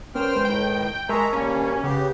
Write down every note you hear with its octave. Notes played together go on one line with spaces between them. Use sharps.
B3 C#4 A#4 C5 G5 F6
G#3 B4
A2 D#3 G5
G#3 A#4 E5 A5 A#5 C#6
D2 G3 A#3 C#4
C#3 B3 G4